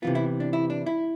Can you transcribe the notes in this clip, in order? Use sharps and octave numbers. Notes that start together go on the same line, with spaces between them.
C3 E3 B3 F4
E4
D4
E4
D4
E4